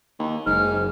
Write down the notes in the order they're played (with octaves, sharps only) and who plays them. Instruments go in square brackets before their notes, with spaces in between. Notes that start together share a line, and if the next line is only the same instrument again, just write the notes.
[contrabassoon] D#2
[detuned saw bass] F#1 [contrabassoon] G#2 [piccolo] F6